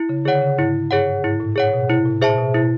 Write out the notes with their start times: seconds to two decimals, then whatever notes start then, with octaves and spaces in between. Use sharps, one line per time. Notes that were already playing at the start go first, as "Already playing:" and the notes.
Already playing: E4
0.09 C#3
0.25 D3 G#4 C#5 F#5
0.42 C#3
0.58 G#2 E4
0.91 G2 G#4 C#5 F#5
1.24 G#2 E4
1.40 A2
1.56 G#4 C#5 F#5
1.73 B2
1.89 C3 E4
2.05 A2
2.22 A#2 G#4 C5 E5 A5
2.38 B2
2.54 B2 E4